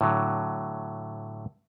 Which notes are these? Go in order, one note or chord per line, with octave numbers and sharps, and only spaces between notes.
A2 D3 F#3